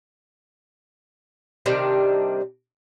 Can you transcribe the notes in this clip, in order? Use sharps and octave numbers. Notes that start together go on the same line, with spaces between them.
C3 D#3 G3 D4